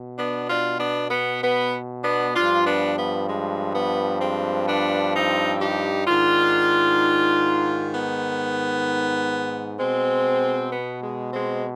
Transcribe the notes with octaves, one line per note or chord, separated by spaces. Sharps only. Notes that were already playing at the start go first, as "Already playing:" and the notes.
Already playing: B2
B3 D4
D4 F4
B3 D4
B3
B3
B3 D4
G2 F3 D4 F4
B3 D4
B3
G#3
B3
G#3 C4
B3 D4
C4 D#4
D#4 G4
G#2 D#3 D4 F4
B3
B2 G#3 C4
B3
G#3
G#3 C4